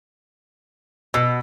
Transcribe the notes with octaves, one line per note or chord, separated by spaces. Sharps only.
B2 E6